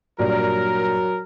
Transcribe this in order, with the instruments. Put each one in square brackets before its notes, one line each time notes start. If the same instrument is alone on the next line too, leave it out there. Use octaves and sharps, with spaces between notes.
[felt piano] G2 A#2 [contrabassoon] F#3 [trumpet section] A#4